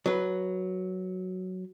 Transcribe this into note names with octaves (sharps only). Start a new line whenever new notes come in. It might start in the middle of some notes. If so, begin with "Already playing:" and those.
F#3 B4